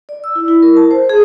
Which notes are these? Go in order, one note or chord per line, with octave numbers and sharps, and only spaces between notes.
D5
E6
E4
E4
A#4
A5
C5
G#4